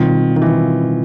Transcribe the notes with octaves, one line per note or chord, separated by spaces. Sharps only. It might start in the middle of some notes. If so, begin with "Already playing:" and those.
Already playing: B2 D#3 G3 C4 F4
D#3
E3